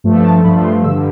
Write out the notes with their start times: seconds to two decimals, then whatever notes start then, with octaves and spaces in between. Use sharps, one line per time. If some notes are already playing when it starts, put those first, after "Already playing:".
0.04 G2 F3 A3
0.24 A5
0.44 G2 F3 A3 B5
0.64 C6
0.84 G2 D3 G3 E6